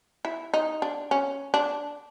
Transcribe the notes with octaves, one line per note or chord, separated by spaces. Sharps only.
E4
D#4
D4
C#4
D4